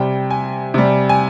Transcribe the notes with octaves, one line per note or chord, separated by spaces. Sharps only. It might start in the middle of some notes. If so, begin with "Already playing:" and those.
Already playing: C3 G3 G5
G#5
C3 G3
G#5